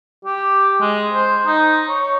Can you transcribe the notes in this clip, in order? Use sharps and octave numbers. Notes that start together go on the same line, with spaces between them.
G4
G#3
C5
D#4
C#5